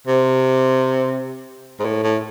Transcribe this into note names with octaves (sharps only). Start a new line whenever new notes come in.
C3
G#2
A2
A2